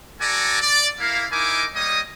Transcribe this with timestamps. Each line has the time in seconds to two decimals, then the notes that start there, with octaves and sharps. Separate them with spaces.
0.21 F#4 A4 D5 G#5 A#5 D6
0.61 D5
1.00 A#3 E4 F5
1.31 D#4 E4 A#4 D#5 G#5 D6
1.75 G3 A#3 C#5 D#5 D#6